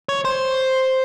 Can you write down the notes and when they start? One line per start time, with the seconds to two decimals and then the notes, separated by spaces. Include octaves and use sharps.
0.09 C#5
0.25 C5